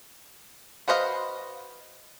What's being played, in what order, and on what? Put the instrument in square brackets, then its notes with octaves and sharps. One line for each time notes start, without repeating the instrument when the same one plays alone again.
[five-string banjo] F#4 B4 C5 D#5 F5